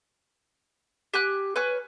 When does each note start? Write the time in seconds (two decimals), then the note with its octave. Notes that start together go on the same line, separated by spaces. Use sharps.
1.14 G4 G#5 F#6
1.56 B4 C#5 G#5 F6